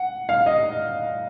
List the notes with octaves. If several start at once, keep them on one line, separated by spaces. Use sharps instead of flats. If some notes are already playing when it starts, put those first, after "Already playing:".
Already playing: F#5
F5
D#5